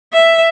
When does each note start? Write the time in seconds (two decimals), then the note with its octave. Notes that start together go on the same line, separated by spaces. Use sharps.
0.13 E5